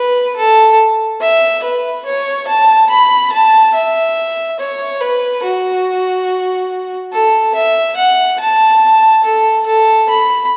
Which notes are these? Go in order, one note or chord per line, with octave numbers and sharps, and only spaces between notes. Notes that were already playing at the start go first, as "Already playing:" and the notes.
Already playing: B4
A4
E5
B4
C#5
A5
B5
A5
E5
C#5
B4
F#4
A4
E5
F#5
A5
A4
A4
B5